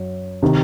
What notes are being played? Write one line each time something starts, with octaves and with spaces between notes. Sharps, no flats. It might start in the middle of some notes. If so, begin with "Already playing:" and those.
Already playing: F#2
C3 D#3